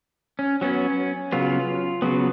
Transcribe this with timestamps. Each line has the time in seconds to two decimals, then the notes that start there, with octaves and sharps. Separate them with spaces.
0.39 C#4
0.61 F#3 B3 C#4
1.32 C#3 F#3 B3 F4
2.02 C#3 F#3 B3